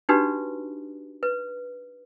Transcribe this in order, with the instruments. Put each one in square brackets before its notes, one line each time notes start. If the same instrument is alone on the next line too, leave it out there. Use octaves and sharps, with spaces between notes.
[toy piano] D4 D#4 F#4 G4 B4
B4